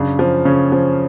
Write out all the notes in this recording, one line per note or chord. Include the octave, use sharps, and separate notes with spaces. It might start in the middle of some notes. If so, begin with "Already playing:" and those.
Already playing: F#2 C#3 D4
F3
C#3 C#4
F3